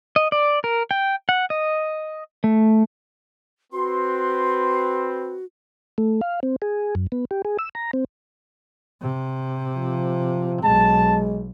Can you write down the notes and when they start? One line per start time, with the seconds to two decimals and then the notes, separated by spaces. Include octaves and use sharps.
0.16 D#5
0.32 D5
0.64 A#4
0.91 G5
1.29 F#5
1.50 D#5
2.44 A3
3.73 C4 F#4 B4 C6
5.98 A3
6.21 F5
6.43 C4
6.62 G#4
6.95 F#2
7.12 B3
7.31 G4
7.45 G#4
7.59 E6
7.75 A#5
7.93 C4
9.02 C3
9.75 F3
10.63 B1 G#3 A5